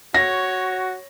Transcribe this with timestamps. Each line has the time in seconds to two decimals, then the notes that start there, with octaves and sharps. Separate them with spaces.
0.14 F#4 C#5 A#6